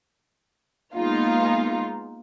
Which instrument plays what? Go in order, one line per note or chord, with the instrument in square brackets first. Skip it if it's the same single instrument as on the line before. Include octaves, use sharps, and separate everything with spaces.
[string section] G#3 A#3 B3 D#4 F4